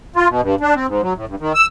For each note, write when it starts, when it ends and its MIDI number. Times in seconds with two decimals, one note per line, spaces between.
0.16 0.28 65
0.29 0.41 47
0.41 0.55 43
0.61 0.74 62
0.75 0.87 60
0.87 1.01 44
1.02 1.13 54
1.16 1.25 45
1.28 1.35 43
1.40 1.53 51
1.54 1.66 88